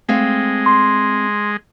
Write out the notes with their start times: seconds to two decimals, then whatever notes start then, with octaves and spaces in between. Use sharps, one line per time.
0.09 G#3 A3 C4 F5
0.66 C6